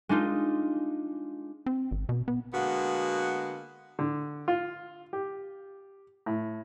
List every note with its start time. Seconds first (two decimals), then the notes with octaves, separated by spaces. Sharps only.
0.09 G#3 D4 D#4 F4
1.66 C4
1.91 G#1
2.09 B2
2.28 B3
2.54 D3 G#3 A#3 B3 F#4 F#5
3.99 D3
4.48 F4
5.13 G4
6.26 A2